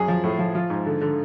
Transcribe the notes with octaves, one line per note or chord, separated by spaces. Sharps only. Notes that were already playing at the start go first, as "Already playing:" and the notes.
Already playing: F#2 G#4
F3
A2
F3
F3 F4
G#2
D3
D3